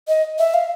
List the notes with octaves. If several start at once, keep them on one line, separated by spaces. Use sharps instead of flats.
D#5
E5
F5